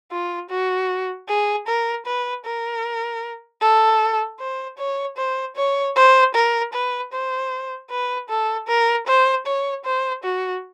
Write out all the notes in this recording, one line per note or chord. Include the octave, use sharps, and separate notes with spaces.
F4
F#4
G#4
A#4
B4
A#4
A4
C5
C#5
C5
C#5
C5
A#4
B4
C5
B4
A4
A#4
C5
C#5
C5
F#4